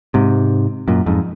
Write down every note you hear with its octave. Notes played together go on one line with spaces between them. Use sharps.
G#2 C3
F#2 A#2
F2 G#2